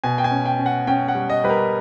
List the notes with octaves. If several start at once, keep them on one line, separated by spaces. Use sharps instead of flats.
B2 G#5
G5
G#5
C#4
G5
C#4
F#5
C#4 G5
F#5
G3
D#5
G3 B4
A#4